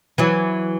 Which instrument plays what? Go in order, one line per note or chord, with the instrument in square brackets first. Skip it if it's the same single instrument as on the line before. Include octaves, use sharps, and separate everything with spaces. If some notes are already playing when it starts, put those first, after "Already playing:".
[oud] E3 F#3